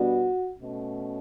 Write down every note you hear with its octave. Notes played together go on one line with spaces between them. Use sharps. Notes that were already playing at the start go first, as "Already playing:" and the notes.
Already playing: B2 G3 B3 D4 F#4
B2 A3 C#4